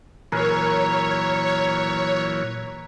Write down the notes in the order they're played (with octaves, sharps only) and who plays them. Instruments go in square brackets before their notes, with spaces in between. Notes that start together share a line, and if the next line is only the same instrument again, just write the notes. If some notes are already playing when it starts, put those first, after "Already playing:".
[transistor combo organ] A#2 E3 F#3 [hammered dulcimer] G#4 A#4 B4 [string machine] C#5